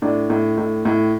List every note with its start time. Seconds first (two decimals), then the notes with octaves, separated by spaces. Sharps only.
0.02 A2 D4
0.30 A2
0.58 A2
0.85 A2